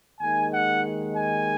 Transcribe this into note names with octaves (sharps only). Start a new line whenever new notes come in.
D#2 D#3 G#3 G#5
F#5
G#5